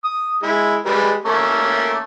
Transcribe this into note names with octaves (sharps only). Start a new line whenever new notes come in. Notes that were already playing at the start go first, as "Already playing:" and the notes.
D#6
G#3 E4
G3 G#3 B4
A3 A#3 C#4